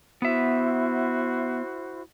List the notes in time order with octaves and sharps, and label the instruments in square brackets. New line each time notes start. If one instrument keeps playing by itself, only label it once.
[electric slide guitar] B3 E5 [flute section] E4 F#4 C5